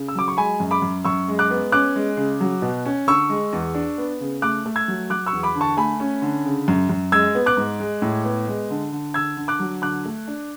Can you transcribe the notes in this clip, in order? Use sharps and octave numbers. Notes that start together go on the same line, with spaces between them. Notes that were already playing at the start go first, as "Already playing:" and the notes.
Already playing: C#3
E6
F#3 D6
C#6
G#3 G#5 B5
F#2
B5 D6
F#2
F#2 C#6 E6
G#3
D6 F#6
B3
C#4 D6 F#6
G#3
C#3
F#3
B2
C#4
D3 C#6 E6
G#3
E2
D4
B3
C#3
A3 D6 F#6
A3
E6 G#6
F#3
F#3 D6 F#6
C#6 E6
E2
B5 D6
D3
A5 C#6
A3 G#5 B5
C#4
D3
C#3
F#2
F#2
G#3 E6 G#6
B3
D6 F#6
G#2
G#3
A2
B3
G#3
D3
D3
D3 E6 G#6
D3
D6 F#6
F#3
D3 D6 F#6
A3
D4